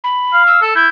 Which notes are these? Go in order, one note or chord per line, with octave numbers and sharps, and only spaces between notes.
B5
F5
E6
A4
E4 G6